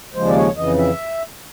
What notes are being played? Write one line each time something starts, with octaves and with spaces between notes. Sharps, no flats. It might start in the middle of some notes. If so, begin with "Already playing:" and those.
D#2 C#3 F3 G#3 C5
D5
C#5
F2 C#3 E3 D#5
E5